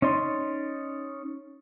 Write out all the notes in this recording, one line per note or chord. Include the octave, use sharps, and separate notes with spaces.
C#4 D#4 D5 C6